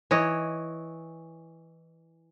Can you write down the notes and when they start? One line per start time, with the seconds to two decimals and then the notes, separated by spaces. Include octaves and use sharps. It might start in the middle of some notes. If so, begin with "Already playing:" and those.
0.11 E3 C#5 D#5